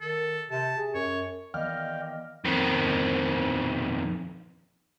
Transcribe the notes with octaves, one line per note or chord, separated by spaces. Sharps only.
D#3 A4
C3 A5
G#4
F#2 C#5
D#3 E3 B3 D5 D#5 F5 G5 F6
F2 D#3